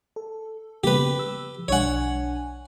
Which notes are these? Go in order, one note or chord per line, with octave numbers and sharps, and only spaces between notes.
A4
C#3 A#3 B3 G4 B4
E6
B1 D4 C#5 F#5 G#5